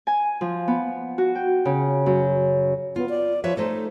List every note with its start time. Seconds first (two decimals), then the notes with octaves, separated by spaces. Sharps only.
0.07 G#5
0.41 F3
0.68 B3
1.18 F#4
1.35 G5
1.65 C#3
2.06 F#2
2.96 B3 F4
3.09 D5
3.44 F3 B4 C#5 E5
3.57 A3 D#4 A4 C5